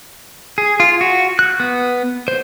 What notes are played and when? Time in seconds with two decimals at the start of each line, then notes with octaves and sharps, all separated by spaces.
0.58 G#4
0.80 F4
1.01 F#4
1.39 F#6
1.60 B3
2.28 C5